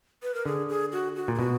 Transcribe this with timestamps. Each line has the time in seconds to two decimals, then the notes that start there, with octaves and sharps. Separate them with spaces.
0.23 B4
0.34 A#4
0.46 D3 G#4
0.69 G#4
0.92 F#4
1.16 F#4
1.28 A#2
1.35 G#4
1.39 B2 F#4